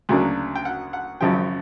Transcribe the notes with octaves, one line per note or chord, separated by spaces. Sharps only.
D2 C#3 F#3 A#3 D4
G5
F#5
F#5
G#1 F#2 C#3 F3 G5